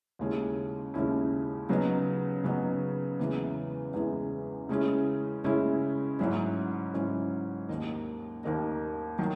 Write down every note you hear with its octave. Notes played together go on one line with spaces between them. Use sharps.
D#2 C#3 G#3 C#4 E4
D#2 C#3 G#3 C#4 E4
C#3 F#3 B3 D#4
C#3 F#3 B3 D#4
E2 C#3 E3 G#3 B3
E2 C#3 E3 G#3 B3
C#3 G#3 C#4 E4
C#3 G#3 C#4 E4
G#2 F#3 C#4 E4
G#2 F#3 C#4 E4
D#2 D#3 A#3 D#4
D#2 D#3 A#3 D#4
D#3 F#3